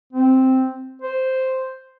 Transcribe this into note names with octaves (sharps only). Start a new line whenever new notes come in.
C4
C5